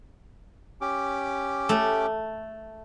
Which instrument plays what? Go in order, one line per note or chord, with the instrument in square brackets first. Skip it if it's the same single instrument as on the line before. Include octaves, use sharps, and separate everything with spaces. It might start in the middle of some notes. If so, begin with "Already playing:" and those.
[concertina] C#4 G4 D6
[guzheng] A3